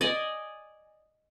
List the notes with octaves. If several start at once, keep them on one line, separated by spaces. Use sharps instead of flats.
D5 D#5 G#5